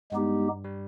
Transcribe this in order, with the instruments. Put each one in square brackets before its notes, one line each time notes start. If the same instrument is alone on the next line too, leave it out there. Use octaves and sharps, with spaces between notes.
[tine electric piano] G2 G3 [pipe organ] G#3 B3 D#4 G4
[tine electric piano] G3